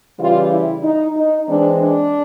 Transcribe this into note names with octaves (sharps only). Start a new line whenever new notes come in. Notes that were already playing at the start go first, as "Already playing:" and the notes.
C#3 E3 G3 F4
E4
D#4
D#4
E3 G#3 C4 D4
D4